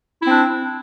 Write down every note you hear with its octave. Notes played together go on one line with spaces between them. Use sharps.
C4 D4 E4